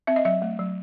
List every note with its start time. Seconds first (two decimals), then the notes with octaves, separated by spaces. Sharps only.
0.07 C4 E5
0.16 D#5
0.25 F#3 E5
0.42 A3
0.59 F#3